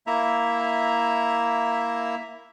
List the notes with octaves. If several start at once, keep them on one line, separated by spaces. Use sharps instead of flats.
A#3 E4 E5 A#5